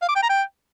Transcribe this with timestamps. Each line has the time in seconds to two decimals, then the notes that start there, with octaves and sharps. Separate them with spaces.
0.02 F5
0.09 D6
0.16 G5
0.22 A#5
0.29 G5